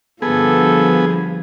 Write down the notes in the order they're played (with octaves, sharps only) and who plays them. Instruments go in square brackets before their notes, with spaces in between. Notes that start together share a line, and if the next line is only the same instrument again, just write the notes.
[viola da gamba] G2 D3 F3 [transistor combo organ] B3 G#4 [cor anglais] A4